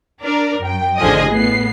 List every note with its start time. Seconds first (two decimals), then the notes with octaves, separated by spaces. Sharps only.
0.22 D4 A#4 D5
0.62 F#2 G5
0.97 A1 D3 F3 G#4 D#5 D#6
1.30 A2 B3 C7